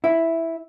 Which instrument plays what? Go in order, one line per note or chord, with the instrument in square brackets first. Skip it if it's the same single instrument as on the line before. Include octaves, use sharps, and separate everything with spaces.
[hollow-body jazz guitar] E4